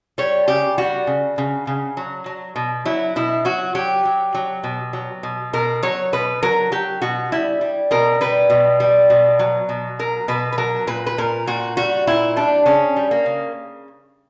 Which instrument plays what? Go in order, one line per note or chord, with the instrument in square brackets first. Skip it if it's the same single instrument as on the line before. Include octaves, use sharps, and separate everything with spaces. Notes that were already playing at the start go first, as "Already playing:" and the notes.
[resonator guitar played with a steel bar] G3 C#5
C#3 G4
G3 F#4
C#3
C#3
C#3
F#3
F#3
B2
F#3 E4
B2 E4
F#3 F#4
F#3 G4
F#3
F#3
B2
F#3
B2
B2 A#4
F#3 C#5
B2 B4
F#3 A#4
F#3 G4
B2 F#4
G3 E4
G3
B2 A#4
G3 B4
B2
G3
B2
F#3
B2
F#3 A#4
B2 B4
B4
F#3 A#4
A#2 B4
B4
A#2 A#4
A#2 F#4
G3 F#4
A#2 E4
G3 D4
C#3 C#4
G3
A#3
C#3